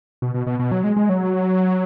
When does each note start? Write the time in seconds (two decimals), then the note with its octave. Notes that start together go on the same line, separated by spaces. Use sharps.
0.22 B2
0.34 B2
0.47 B2
0.59 B2
0.72 F#3
0.84 G#3
0.97 G#3
1.09 F#3